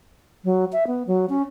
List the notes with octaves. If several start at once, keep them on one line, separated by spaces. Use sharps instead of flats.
F#3
E5
B3
F#3
C#4